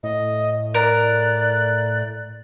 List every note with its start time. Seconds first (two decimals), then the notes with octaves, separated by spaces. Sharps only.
0.03 A2 D#5
0.74 A#4 D5 F#6